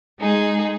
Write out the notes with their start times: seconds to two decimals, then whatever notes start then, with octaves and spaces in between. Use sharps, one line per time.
0.19 G#3 D#4 G#4